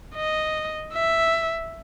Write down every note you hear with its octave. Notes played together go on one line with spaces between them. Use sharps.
D#5
E5